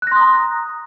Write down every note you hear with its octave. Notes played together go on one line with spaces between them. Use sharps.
A#5 C6 D#6 F#6 A#6